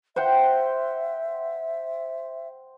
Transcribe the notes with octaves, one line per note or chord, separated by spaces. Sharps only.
C5 E5 F#5 G5